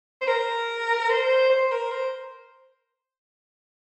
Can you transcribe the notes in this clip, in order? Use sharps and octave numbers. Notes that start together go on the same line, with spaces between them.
C5
A#4
C5
C5
A#4
C5